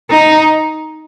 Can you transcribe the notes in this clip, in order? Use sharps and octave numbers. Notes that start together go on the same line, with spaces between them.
D#4